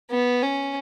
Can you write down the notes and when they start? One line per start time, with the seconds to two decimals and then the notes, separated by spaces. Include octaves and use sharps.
0.11 B3
0.42 C#4